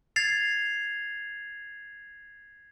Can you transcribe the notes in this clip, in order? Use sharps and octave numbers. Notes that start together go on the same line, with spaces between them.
G#6 A6 C7 F7